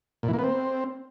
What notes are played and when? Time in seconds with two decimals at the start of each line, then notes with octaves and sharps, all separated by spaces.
0.23 A#2
0.28 E3
0.33 A#3
0.39 B3
0.44 C4